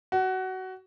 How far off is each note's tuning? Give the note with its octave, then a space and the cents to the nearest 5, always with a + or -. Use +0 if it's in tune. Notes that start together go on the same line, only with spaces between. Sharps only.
F#4 +20